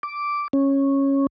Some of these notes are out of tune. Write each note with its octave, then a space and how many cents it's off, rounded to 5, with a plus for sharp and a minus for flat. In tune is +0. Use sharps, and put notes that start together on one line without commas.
D6 -5
C#4 -10